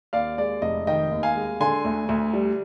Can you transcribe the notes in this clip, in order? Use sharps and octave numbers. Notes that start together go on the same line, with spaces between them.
D#2 D5 F5
G#3 D5
F1 D#5
D#3 D#5 G5
D#2
F5 G#5
G#3
D3 G#5 C6
D2
D2
G3